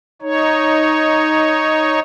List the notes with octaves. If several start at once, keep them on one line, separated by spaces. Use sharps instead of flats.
D#4 C#5